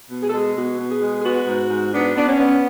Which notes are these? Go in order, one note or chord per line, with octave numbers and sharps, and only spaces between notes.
B2
G#4
A4
G#3 G#4
B2 F#4
B2
G#4
G#3
G#4
B3 F#4
G#2
G#2
B3 D4
B3 D4
C#4
B3